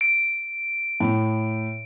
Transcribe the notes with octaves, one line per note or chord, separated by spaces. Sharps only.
D7
A2